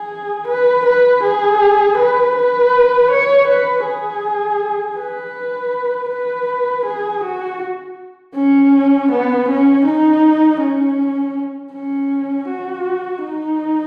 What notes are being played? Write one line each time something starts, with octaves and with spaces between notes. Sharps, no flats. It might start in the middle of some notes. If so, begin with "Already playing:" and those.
Already playing: G#4
B4
B4
G#4
B4
B4
C#5
B4
G#4
B4
B4
G#4
F#4
C#4
B3
C#4
D#4
C#4
C#4
F#4
D#4